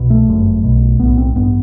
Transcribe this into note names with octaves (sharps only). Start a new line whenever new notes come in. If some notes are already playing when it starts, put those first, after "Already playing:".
Already playing: C2 B2
A3
G1 F#2
B1 B2
B1 A2 B3
C4
A1 G2 B3